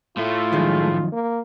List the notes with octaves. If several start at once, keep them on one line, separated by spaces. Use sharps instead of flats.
A2 A3 F4
F#2 D#3 F3 G#3
A#3